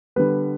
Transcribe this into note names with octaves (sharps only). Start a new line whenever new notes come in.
D3 G3 B3 B4